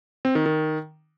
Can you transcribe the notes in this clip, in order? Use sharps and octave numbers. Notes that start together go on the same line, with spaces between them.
C4
D#3
D#3